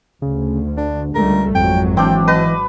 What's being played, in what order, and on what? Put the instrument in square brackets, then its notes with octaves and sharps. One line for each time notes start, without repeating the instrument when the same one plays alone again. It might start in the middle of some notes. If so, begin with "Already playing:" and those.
[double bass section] D2 [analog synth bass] C#3
[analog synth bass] D3 [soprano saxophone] D4
[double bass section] C#2 G3 A3 [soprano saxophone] A#4
[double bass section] G#1 F#3 [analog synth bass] F2 [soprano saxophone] G5
[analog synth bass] E3 [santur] C4 D4 [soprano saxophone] G5
[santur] B4 [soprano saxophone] D#5